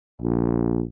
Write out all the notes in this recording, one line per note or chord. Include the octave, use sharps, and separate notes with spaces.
A#1